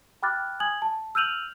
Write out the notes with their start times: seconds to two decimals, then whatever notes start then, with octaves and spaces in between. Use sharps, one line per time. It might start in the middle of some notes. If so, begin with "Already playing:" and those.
0.23 G5 B5 D6 F6 F#6 A6
0.60 G#5 D#6 G#6 F#7
0.82 A5
1.15 E6 F6 G6 D#7 F7 F#7